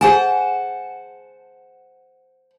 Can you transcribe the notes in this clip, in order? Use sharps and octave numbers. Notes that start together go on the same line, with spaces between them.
G#4 C5 F#5 G#5 A5